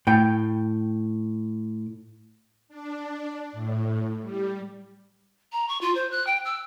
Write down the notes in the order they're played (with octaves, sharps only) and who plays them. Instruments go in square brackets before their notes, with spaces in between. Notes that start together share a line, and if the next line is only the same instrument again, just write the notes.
[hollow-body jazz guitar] A2 G5
[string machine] D4
A2
G3
[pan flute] A#5
C#6
F4
C5
F#6
G5
E6